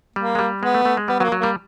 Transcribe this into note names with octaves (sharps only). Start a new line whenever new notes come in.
G3 A#3
G#3
G3
G#3 B3
A3
A3
G#3
G3 B3
F#3 B3
A#3
F#3
G3 A#3